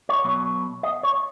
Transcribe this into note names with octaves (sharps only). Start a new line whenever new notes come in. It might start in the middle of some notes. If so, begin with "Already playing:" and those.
C#5
B1 B2 F#3
D#5
C#5